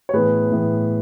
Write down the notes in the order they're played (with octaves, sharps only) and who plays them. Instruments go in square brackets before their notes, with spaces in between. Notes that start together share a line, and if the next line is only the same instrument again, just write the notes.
[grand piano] C#5
A2 E3 B3 G#4 B4
A2 E3 B3